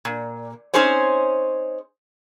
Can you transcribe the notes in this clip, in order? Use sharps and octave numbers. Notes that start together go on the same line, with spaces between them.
A#2
C4 C#4 D#4 G#4 C5 C#5